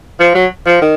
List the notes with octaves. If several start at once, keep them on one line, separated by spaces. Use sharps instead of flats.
F3
F#3
F3
D#3